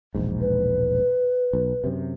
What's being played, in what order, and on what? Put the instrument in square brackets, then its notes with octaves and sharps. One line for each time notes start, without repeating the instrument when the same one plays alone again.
[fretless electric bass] E1 A#1 G#2
[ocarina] B4
[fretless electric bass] B1
F#2 C3